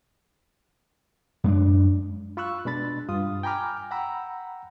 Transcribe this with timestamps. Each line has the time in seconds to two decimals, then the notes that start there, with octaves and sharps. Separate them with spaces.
1.44 F#2 G#3 D4
2.37 F4 B5 C#6 E6 F#6
2.65 B2 G#3 D4 B5 A6
3.09 G2 F4 D#6
3.43 G5 G#5 A#5 B5 D6 F6
3.91 F#5 G5 A#5 B5 E6